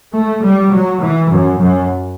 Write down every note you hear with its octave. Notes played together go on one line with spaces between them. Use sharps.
A3
G3
F#3
E3
F#2
F#2